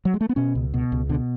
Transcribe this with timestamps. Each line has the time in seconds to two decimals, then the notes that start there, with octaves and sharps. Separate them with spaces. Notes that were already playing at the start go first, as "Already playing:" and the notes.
0.05 F#3
0.14 G#3
0.21 A3
0.29 B3
0.36 B2 C#4
0.55 C#2
0.74 B2
0.92 C#2
1.09 B2 D3